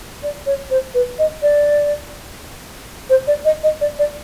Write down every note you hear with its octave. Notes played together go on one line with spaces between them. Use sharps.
D5
C#5
C5
B4
D#5
D5
C5
D5
D#5
D#5
D5
D5